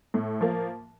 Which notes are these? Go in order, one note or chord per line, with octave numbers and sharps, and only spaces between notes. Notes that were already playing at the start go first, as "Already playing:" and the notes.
A2
F3 A#3